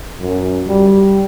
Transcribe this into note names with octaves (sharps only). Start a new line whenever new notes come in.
F#2
G3